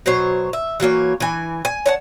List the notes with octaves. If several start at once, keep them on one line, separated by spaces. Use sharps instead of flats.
B2 F#3 C5 C#5
E5
E3 F#3 A#3 C#5
E3 G#5
G#5
C#5 F#5 A5